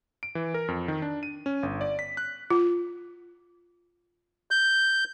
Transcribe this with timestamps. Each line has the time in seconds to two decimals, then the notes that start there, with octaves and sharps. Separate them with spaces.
0.23 D7
0.35 E3
0.54 A#4
0.68 F2
0.88 D#3
1.02 D4
1.23 D#7
1.46 C#4
1.63 G1
1.81 D5
1.99 B6
2.17 F#6
2.50 F4
4.51 G6